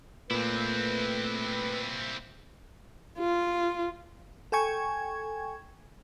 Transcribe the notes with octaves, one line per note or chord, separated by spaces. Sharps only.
A#2 A3 C4 E4 B4
F4
A4 G5 G#5 C#6 G#6